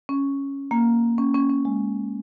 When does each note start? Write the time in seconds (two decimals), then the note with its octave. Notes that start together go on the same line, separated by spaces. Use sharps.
0.09 C#4
0.71 A#3
1.18 C#4
1.34 C#4
1.50 C#4
1.65 G#3